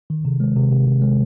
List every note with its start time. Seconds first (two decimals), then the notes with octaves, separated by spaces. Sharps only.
0.10 D#3
0.25 C3
0.40 G#3
0.56 C3
0.71 C3
0.87 C3
1.02 G#3